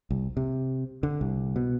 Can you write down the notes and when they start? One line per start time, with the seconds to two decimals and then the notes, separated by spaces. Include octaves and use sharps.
0.10 C2
0.37 C3
1.03 D3
1.21 C2
1.56 B2